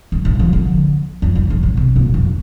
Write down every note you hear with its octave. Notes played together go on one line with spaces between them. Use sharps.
G2
A2
F3
D3
F2
A2
A2
A2
C3
A#2
F2